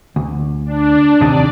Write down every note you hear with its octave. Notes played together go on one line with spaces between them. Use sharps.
D2
D4
D#2 C3 D#4 D5